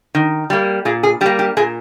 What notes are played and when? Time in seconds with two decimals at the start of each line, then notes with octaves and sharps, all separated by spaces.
0.15 D#3
0.50 G3 A#3
0.85 A#2 G#4
1.03 G#4
1.21 G3 G4
1.26 A#3
1.39 G4
1.57 A#2 G#4